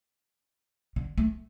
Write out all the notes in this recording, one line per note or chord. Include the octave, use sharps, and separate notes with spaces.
D3
A3